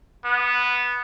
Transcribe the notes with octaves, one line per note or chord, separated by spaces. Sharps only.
B3